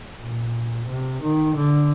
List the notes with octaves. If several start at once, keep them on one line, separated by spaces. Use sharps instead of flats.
A#2
C3
D#3
D3